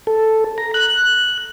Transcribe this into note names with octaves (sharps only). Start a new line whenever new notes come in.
A4
A#5
F#6